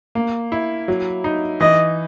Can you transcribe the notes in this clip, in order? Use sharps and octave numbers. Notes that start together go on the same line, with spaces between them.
A#3
E4
F#3
D#4
E3 D#5